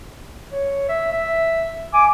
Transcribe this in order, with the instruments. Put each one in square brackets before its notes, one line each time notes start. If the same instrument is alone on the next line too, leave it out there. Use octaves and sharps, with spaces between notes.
[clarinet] C#5
E5
E5
[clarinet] G#5 [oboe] D6